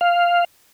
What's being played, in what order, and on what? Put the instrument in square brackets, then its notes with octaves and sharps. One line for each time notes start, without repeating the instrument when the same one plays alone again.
[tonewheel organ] F5